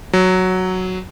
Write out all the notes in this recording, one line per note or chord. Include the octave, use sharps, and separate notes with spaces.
F#3